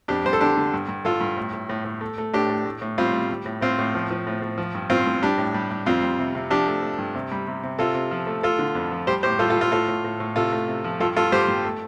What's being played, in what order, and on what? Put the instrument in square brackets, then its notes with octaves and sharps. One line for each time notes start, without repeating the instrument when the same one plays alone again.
[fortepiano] F2 D4 G4
G3 C5
A4
D3 D4 G4
D3
G2
G2
G2 F4 A4
G2
A2
A2
A2
A2
A3
A3
A2 D4 G4
A3
A2
A2
G3 C4 F4
G3
G3
A2
A2 C4 F4
A2
F3
F3
A2
A2
F3
G2
G2 C4 F4
G2
G3 D4 G4
A2
G3
G3
F2 C4 F4
G3
C3
C3
F3 D4 G4
A3
A3
G2
C3
G3
C3
C3
C3 F4 A4
C3
F3
A3
A3 F4 A4
D3
F2
F3
G3 G4 C5
A2 G4 C5
G3 F4 A4
F4 A4
G3
F4 A4
A2 F4 A4
A2
A2
A2
C3 F4 A4
A3
C3
F3
G2 F4 A4
G2 F4 A4
G2 G4 C5
G2
A3